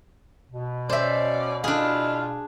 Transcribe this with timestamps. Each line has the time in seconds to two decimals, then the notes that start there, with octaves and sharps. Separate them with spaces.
0.52 B2
0.89 C#4 C5 D5 E5
1.64 D4 E4 F4 G#4 F5